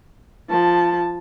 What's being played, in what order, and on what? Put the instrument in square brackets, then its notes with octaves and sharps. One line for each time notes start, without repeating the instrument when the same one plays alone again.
[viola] F3 A5